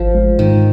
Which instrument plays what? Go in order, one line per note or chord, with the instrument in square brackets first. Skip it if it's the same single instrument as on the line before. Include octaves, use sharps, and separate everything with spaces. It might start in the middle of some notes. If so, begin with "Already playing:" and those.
Already playing: [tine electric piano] G#1 [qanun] F3
[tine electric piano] G#3
[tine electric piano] G#2 [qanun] D#3